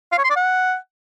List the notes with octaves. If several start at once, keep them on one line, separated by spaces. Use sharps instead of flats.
F5
C#5
C6
D5
F#5